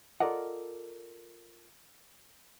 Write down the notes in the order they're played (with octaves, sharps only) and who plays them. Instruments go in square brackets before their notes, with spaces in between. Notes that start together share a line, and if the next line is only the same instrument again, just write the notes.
[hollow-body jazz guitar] F4 A4 A#4 D5 D#5 F#5